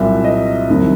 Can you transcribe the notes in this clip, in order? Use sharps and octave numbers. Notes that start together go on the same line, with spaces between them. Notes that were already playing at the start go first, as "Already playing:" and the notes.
Already playing: C2 A#2 F#3 E5
D#5
C2 C3 D#3 F#3